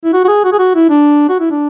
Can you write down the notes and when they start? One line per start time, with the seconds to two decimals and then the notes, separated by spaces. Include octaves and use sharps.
0.04 E4
0.13 F#4
0.24 F#4
0.28 G#4
0.45 F#4
0.53 G#4
0.59 F#4
0.75 E4
0.90 D4
1.29 F#4
1.40 E4
1.51 D4